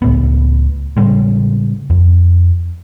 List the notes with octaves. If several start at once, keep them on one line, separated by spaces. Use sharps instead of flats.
C#2 A2 B3
A2 C#3 G3 G#3
F2